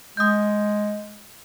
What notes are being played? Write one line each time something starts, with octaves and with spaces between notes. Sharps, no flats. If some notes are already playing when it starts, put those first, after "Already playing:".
G#3 D#6 G6